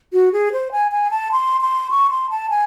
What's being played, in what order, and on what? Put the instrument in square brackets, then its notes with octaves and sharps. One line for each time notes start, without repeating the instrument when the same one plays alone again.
[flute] F#4
G#4
C5
G#5
G#5
A5
C6
C6
C#6
C6
A5
G#5